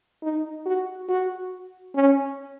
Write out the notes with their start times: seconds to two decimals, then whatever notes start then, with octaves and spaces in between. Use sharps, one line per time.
0.23 D#4
0.66 F#4
1.09 F#4
1.95 C#4